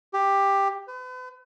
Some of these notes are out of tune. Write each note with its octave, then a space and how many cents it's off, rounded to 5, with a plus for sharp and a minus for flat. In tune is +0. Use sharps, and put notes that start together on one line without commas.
G4 +10
B4 +40